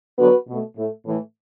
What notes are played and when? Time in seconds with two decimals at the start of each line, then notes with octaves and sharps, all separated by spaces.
0.18 D3 F#3 B3 F#4 B4
0.48 B2 A3
0.76 A2 A3
1.05 A2 E3 A3